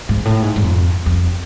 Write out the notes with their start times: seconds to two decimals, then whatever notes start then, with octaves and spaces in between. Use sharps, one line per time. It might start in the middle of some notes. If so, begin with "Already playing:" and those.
0.09 G#2
0.25 A2
0.42 G#2
0.56 G#2
0.63 F2
1.06 F2